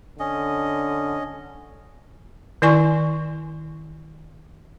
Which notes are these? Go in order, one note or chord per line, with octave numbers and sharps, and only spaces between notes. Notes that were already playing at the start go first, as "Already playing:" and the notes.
D3 C#4 D#5
D#3 E4 D5 G#5 C6 C#6